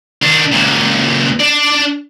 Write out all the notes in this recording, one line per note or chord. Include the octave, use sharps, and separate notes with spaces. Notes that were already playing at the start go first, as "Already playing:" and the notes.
D#3 D4
C#2 A#2
D4 D5